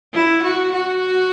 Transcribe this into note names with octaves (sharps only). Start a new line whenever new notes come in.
E4
F#4
F#4